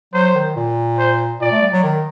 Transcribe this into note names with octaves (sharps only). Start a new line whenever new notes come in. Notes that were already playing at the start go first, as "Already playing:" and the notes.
F#3 C5
D#3
A#2
C5
A#2 D5
A3
G3
F#3
D#3